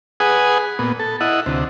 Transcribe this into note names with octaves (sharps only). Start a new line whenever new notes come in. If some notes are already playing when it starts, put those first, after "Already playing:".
G#4 B4 F#5 G#5 D#6
A#2 B3
A4
E4 D#5 F#5
D2 C3